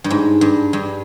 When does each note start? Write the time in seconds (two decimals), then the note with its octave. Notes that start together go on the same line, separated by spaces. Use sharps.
0.04 G2
0.10 G#2
0.41 G2
0.73 G2